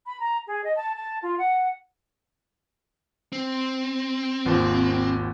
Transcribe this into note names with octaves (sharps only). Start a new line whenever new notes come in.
B5
A#5
G#4
D#5
A5
A5
F4
F#5
C4
G#1 D#2 F3